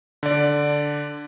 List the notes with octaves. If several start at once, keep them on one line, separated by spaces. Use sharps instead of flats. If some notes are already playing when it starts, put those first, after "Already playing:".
D3 D5